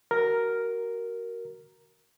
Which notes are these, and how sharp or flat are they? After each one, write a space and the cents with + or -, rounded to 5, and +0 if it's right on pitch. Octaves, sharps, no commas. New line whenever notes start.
F#4 +20 A#4 +0